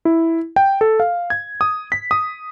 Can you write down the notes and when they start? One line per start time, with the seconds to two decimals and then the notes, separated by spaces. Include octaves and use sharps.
0.05 E4
0.56 G5
0.81 A4
1.00 F5
1.30 G#6
1.61 D#6
1.92 B6
2.11 D#6